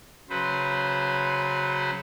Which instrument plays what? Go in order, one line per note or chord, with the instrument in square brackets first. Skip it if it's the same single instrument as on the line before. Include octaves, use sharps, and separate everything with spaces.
[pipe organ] C#3 F#3 B4 C5